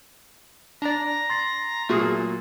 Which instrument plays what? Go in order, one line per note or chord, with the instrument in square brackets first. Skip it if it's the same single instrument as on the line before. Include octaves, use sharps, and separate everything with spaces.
[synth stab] D4 D5 [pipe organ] A#5
[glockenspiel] C6 A6 C7
[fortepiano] A#2 F#3 [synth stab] A3 F#4 G#4